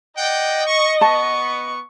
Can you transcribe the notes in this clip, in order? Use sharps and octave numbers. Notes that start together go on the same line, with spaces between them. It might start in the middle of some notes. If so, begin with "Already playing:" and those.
D5 D#5 F#5 G5
C#6
B3 A5 C#6